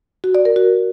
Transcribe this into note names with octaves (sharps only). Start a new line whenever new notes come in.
F#4
D5
A#4
F#4